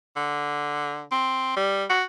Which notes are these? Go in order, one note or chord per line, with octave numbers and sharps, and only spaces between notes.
D3
C4
G3
F#4